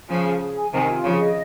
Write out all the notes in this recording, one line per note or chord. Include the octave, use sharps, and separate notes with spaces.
C#3 F3 G#5
G#4
G#4
G#5
C3 D#3 G#5
F4
C#3 F3 G#4
D#5